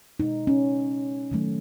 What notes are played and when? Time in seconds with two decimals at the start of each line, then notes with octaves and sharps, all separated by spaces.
0.20 B2 G#3 D#4
0.47 C#4
1.31 D#3 F#3 A3